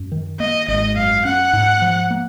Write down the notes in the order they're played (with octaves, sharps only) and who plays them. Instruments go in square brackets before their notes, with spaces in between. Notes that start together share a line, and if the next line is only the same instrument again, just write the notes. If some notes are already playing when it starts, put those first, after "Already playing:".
Already playing: [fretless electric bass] F#2
D#3
[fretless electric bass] A#3 [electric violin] D#5
[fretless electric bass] G#1 [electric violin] D#5
[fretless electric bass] F#2 [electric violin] F5
[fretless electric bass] C#4 [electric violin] F#5
[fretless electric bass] G#2
F3
A#3